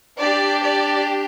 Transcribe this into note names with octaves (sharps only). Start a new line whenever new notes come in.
D4 G4 D5
D5